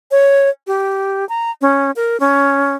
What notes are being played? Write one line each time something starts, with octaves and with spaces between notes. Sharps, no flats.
C#5
G4
A#5
C#4
A#4
C#4